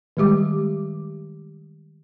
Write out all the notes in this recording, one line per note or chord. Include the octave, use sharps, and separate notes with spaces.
D#3 G3 G#3 G4 D6